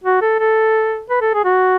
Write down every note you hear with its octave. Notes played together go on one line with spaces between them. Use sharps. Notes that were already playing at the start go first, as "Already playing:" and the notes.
F#4
A4
A4
B4
A4
G#4
F#4